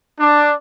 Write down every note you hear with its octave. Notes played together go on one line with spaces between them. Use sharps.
D4